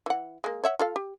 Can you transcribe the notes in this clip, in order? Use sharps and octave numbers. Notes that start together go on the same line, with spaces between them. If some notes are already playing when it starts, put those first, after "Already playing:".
E3 F#5
G#3 A#3
C#5 E5 F#5
F4 A4 F5
G4